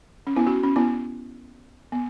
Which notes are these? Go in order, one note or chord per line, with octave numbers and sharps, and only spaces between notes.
C#4
B3 E4
C#4 F#4
C#4
B3 E4
B3